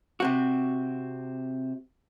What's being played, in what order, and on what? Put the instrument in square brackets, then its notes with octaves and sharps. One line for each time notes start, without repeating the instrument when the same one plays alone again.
[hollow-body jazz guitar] C3 C4 F#4